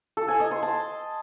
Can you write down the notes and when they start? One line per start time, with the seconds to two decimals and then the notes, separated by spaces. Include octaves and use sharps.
0.17 A4
0.28 G#5
0.40 D#5
0.51 C6
0.63 A5